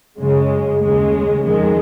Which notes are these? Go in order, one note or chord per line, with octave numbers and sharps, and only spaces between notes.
F#2 C#3 G#3
D#2 C#3 G#3
F2 D#3 G#3